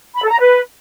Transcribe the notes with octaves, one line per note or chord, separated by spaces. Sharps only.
B5
A4
A#5
B4